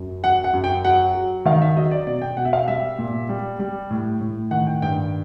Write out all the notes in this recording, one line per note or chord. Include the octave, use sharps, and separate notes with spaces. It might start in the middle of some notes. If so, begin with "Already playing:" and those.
Already playing: F#2
F#3 F#5
F#5
F#2
G5
F#3 F#5
F#3
D#3 F5
E5
F#3 D#5
D5
B2 D5
G5
B2 F#5
E5
F5
G3 E5
A#2
G3
G3
A2
A2
D#3 F#5
G5
G2 G5